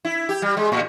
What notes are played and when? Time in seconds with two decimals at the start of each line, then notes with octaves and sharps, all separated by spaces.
0.05 E4
0.29 G4
0.42 G3
0.57 G#3
0.72 A2